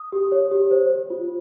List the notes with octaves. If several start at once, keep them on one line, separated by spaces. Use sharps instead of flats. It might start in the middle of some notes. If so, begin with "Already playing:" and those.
Already playing: D#6
G4
C#5
G4
C5
C5
F4